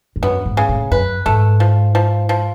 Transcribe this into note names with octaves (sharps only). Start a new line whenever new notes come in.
G#2
F#2 B3
G#2
C#3
A2
F#2 B4
G#2 A3
F3
F3
F3